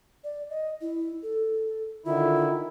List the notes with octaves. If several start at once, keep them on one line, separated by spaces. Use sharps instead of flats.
D5
D#5
E4
A4
D3 D#3 E4 F4